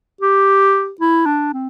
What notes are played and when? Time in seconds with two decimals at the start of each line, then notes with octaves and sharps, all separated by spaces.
0.21 G4
1.01 E4
1.26 D4
1.54 C4